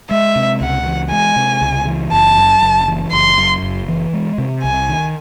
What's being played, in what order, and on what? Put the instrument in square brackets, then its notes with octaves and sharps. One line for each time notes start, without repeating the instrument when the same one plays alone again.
[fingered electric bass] G#3 [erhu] E5
[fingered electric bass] C3
[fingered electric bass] C#2 [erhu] F#5
[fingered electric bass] E3
[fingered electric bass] G#3 [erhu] G#5
[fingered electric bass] C3
C#2
E3
[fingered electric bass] F#1 [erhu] A5
[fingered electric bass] F#2
F#1
E3
[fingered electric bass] F#1 [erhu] C6
[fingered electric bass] F#2
F#1
E3
G#3
C3
[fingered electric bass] C2 [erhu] G#5
[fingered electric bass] D#3